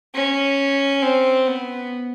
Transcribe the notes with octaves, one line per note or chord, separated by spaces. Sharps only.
C#4
C4
B3